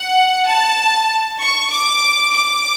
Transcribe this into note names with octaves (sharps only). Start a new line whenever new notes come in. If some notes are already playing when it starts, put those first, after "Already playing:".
Already playing: F#5
A5
C#6
D6
D6